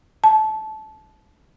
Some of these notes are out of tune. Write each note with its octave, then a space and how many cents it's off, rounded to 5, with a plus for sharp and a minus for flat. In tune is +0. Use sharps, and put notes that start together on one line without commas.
A5 -20